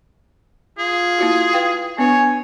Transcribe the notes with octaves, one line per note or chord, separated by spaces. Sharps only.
F4 G#4
A#3 E4 F#4
B4 F5 G5
B3 D4 B4 C#5 G#5